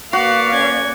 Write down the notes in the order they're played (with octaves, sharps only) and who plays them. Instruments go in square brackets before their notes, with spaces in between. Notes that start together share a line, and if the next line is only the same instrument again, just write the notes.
[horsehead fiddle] A#3 D5 [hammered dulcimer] F#4 [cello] B4 F5
[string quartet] C#4 G#6